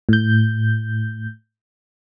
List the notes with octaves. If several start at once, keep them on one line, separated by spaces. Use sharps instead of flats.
A2 G6